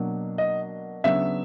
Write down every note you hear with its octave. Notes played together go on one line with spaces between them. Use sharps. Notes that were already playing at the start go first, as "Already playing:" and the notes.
Already playing: B2 F#3 A#3 D4
D#5
C#3 F#3 B3 D4 E5